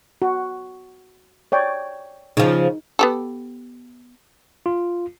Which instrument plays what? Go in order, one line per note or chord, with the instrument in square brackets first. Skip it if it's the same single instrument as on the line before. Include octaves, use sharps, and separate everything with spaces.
[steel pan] F#4
C#5 D5 G5
[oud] C#3 F3 [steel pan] D#4
[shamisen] B3 G4 A4
[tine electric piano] F4